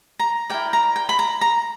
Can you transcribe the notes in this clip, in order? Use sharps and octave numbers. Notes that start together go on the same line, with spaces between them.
A#5
E4 A#4 D5 G5
A#5
G5
B5
A#5
A#5